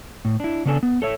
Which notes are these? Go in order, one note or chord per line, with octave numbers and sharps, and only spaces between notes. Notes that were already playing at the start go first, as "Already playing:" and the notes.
A2
D4 E4
C#3 B3 D4 A4 G#5
B3
A4 C#5 E5